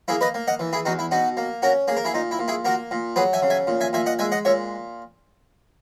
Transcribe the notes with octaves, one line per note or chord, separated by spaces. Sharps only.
A#3 E4 G#4
B4 D#5
A#3
D#5 F#5
E3
E4 G#4
E2 D#4 F#4
E4
B2 D#4 F#4
A#3
C#4 F#4 A#4
A#3 G#4
A#4
E4 G#4
A#2 D#4
E4
A#2
E4 G#4
A#3 F#4 A#4
A#2
F#3 G#4 B4
E5 G#5
C#3
E5 G#5
A#2
E5 G#5
A#2 E5 G#5
D#5 F#5
G#3 E5 G#5
D#5 F#5
A#2 C#5 E5